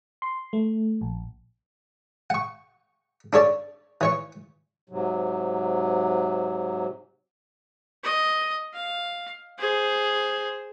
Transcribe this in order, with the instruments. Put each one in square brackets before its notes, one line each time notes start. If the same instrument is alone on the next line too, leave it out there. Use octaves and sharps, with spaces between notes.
[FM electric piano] C6
A3
A#1
[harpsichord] F#5 C#6
D4 A4 C#5 D5
E3 C#5 C#6
[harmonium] G#2 C3 F#3
[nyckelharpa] D#5
F5
G#4 C5